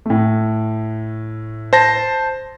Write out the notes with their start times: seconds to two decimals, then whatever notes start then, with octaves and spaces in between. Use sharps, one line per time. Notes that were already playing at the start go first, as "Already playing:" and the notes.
0.06 A2 A3
1.73 C5 A5 A#6